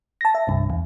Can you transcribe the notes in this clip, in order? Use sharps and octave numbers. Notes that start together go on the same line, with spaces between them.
A5 A#6
E5
C2 G2
E2